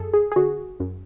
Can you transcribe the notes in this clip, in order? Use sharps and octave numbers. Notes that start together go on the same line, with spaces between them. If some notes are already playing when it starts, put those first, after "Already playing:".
Already playing: F#2 G#4 A4
G#4
G#4
D3 F#4
F#2